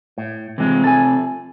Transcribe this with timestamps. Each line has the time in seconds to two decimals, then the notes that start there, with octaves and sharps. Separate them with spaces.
0.18 A2
0.58 C3 E3 F3 G#3 C4
0.84 A4 G#5